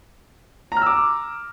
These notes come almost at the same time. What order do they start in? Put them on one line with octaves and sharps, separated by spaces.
A#5 F6 E6 D6